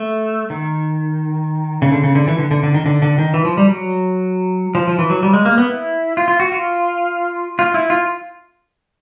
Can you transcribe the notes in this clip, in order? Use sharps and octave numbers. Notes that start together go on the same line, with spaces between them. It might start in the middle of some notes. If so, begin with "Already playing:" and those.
Already playing: A3
D#3
C#3
D3
C#3
D3
E3
D3
D3
D3
D#3
D3
D3
D#3
E3
F3
G3
F#3
F3
F3
E3
F#3
G3
G#3
A#3
B3
E4
F4
F4
F#4
F4
F4
E4
F4